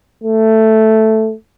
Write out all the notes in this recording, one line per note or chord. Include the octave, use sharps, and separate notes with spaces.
A3